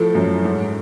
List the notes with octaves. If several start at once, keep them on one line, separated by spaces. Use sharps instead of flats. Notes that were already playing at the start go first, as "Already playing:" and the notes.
Already playing: A2 F3 A4
F#2
G#2